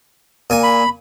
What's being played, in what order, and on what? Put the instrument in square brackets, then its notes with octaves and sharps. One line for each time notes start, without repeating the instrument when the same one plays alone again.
[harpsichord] A#2 G#5
[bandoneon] B5